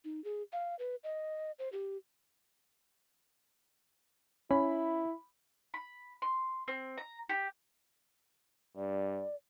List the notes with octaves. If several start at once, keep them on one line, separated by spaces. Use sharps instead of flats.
D#4
G#4
F5
B4
D#5
C5
G4
C#4 E4 B5
B5
C6
C4
A#5
G4
G2 D5